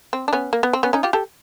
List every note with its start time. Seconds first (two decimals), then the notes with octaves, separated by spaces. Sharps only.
0.13 C4
0.28 D4
0.33 B3 C#4
0.53 A#3
0.63 B3
0.73 C4
0.83 B3 C#4
0.93 C#4 D#4
1.03 F4 G4
1.13 G4 A4